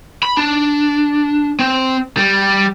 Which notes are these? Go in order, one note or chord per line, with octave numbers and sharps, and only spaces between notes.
B5
D4
C4
G3